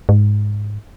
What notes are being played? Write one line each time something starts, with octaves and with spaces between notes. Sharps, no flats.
G#2